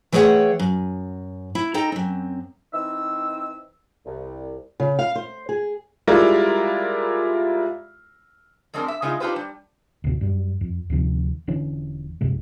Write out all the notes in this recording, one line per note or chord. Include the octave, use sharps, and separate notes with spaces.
E3 A3 G#4 C#5 F#5 G5
F#2
E4
D#4 A4 G5 A#5
F#2 C4
E3 C4 D#4 E6
C2
C#3
F5
C5
G#4
G3 G#3 E4 F4 A#4 D5
F2 G#3 C4 D4 A#4
E5
C#3 G#3 D#4 F4
D4 D#4 F4 G4 B4 C5
G3
D2 B2
F#2 G3
F2
D2 C3 D#3 F3
E1 D3 E3 C#4
A#1 F#2 C3 G#3